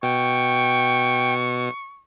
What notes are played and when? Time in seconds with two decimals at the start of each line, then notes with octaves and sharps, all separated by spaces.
0.03 B2 G5 C#6